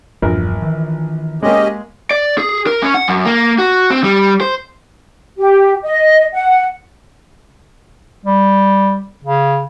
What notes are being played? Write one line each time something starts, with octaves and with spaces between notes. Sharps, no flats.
E1 A#1 E2 G2 A#4
D#3 E3
G#3 A#3 C#4 G4 D#5
D5
G#4
A#4
C#4
F#5
F#2
A#3
F#4
C4
G3
C5
G4
D#5
F#5
G3
C#3